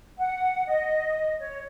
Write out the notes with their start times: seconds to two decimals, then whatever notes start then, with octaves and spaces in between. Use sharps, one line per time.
0.18 F#5
0.66 D#5
1.40 C#5